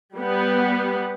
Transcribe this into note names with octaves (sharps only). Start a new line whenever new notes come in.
G3 B3